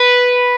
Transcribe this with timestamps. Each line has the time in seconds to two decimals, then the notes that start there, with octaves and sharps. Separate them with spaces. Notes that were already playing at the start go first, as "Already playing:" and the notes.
Already playing: B4